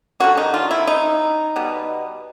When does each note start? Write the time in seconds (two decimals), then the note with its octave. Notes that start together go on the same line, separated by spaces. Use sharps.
0.20 D3 G3 A#3 F#4
0.37 D#4
0.54 F4
0.71 E4
0.87 D#4
1.56 B2 G3 B3